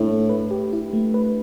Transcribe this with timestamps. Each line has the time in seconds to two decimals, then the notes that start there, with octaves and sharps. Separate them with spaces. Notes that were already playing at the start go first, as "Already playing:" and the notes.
Already playing: A2 D4
0.09 A3
0.29 B4
0.51 G4
0.73 E4
0.93 A3
1.14 B4